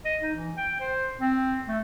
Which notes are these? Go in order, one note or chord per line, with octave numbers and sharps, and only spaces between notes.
D#5
D#4
E3
G5
C5
C4
A3